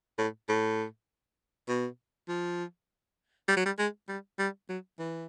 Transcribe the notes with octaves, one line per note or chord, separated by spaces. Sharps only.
A2
A2
B2
F3
G3
F#3
G3
G#3
G3
G3
F#3
E3